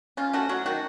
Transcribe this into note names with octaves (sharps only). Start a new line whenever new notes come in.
C#4 F4
A3 F#4
F#3 F#4
D#3 F#4